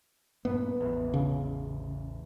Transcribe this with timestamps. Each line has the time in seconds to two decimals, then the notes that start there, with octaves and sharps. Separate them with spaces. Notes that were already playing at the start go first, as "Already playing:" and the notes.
0.45 G2 A#2 B3
0.81 A1 E2
1.14 C#3